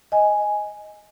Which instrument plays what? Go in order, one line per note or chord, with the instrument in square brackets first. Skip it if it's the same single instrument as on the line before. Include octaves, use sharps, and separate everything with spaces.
[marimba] D#5 G#5